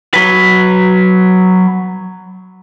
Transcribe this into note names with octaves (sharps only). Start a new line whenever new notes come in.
F#3 B4